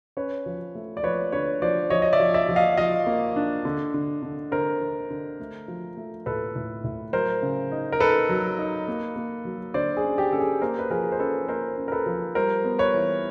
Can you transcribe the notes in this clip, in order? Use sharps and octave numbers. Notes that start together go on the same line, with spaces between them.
C#4 B4 C#5
F3
A3
D5
F3 B4 C#5
D3 B4 C#5
F3 C5 D5
F3 C#5 D#5
D#5
D5 E5
F3
D5 E5
F3
D#5 F5
F3 D#5 F5
A#3
D4
D3
D3
D3
D3 A#4 C5
D3
D3
A3
F3
A3
A2 A4 B4
A2
A2
F#3 A#4 C5
C#3
D#4
A#4
D#4 A4 B4
F#3
D#4
A#3
A#3
F#3
D3 C5 D5
G#4
C#4
G4
C#4 A4
G#4
A#3 A#4 C5
B4
F3 G#4 A#4
C5
C#4 A4 B4
A#3 A#4 C5
C#4
A#4
A4 B4
F3
G3 A#4 C5
B3
B4 C#5
E3